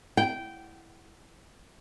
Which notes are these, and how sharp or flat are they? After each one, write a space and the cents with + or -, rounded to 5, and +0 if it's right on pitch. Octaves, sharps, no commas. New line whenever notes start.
G5 -15